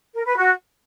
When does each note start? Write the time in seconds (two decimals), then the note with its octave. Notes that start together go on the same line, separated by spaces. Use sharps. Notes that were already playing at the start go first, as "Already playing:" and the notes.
0.14 A#4
0.25 B4
0.36 F#4